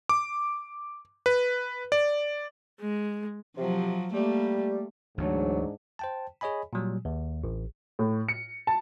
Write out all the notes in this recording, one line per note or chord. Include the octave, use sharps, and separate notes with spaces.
D6
B4
D5
G#3
C3 F3 F#3
G3 A3 A#3
D2 G#2 E3 F#3 A3 D4
C5 G5 A5
G#4 C#5 D#5 G#5 B5
A#2 F#3 G3
D#2
A1
A2
C#7
A5